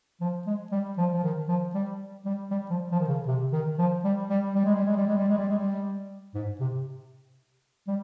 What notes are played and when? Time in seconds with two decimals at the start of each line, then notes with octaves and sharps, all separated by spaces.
0.21 F3
0.46 G#3
0.72 G3
0.97 F3
1.14 F3
1.23 D#3
1.49 F3
1.74 G3
2.26 G3
2.51 G3
2.70 F3
2.92 F3
3.00 D#3
3.08 C#3
3.27 C3
3.53 D#3
3.79 F3
4.04 G3
4.30 G3
4.55 G3
4.65 G#3
4.76 G3
4.86 G#3
4.96 G3
5.07 G#3
5.17 G3
5.28 G#3
5.38 G3
5.49 G#3
5.59 G3
6.34 G#2
6.60 C3
7.88 G3